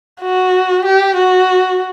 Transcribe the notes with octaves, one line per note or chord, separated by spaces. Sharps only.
F#4
G4
F#4